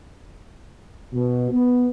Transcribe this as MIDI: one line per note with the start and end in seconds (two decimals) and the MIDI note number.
1.14 1.50 47
1.52 1.88 59